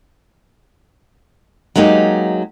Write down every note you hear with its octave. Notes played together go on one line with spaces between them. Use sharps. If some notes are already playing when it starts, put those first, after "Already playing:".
F#3 G#3 A#3 D#4 G4